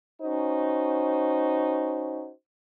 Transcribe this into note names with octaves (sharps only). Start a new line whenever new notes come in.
C#4 D#4 F#4 C5